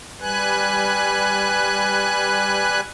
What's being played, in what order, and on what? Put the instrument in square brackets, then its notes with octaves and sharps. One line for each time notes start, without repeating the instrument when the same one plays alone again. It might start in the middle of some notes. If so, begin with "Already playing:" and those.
[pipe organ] G3 B4 G#5 F#6